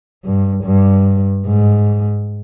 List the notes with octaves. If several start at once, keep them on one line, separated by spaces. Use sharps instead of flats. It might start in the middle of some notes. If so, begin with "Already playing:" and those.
G2
G2
G#2